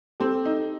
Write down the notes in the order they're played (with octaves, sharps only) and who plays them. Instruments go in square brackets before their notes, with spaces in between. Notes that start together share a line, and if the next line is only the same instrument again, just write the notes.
[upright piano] C4 [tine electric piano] G4 A4
[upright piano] D#4